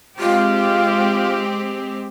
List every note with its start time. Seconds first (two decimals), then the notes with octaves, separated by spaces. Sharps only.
0.19 G#3 C4 F4 G4